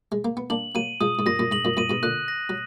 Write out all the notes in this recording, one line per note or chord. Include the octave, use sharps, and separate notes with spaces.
G#3
A#3
B3
A#3 D4 F#7
F#3 A#3 D#7
F3 G#3 D#6
G#2
F#2 A#2 A#6
F#2 A#2
G#2 F#7
F#2 A#2
F#2 A#2 D#7
G#2 B2
A#2 D3 F#6
A#6
F#3